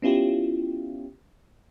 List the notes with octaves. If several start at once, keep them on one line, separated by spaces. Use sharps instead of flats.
B3 C#4 E4 F4 G4